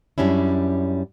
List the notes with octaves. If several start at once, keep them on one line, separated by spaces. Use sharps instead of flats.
F#2 G3 C#4 D4 E4